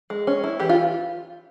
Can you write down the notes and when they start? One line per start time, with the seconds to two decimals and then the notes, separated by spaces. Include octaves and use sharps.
0.10 G#3
0.27 C#4
0.44 E4
0.60 E3 G4
0.69 F4